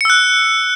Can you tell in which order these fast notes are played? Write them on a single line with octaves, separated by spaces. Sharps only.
C#7 E6 F#6